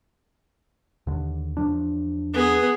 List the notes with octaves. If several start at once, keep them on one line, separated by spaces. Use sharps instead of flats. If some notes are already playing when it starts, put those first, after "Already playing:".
D#2 D3
E2 F3 D4
B3 G#4